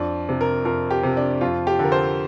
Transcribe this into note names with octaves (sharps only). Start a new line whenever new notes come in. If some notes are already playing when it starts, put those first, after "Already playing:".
Already playing: F2 D4
C3
A#4
F2 A#4
G4
C3
D4
F2 F4
G4
D3 A#4
C5